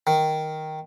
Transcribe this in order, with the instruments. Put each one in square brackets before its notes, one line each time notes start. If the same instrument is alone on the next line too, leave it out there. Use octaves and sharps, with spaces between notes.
[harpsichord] D#3